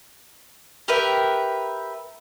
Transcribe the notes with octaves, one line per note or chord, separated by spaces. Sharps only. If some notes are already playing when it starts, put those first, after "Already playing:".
G4 A#4 B4 E5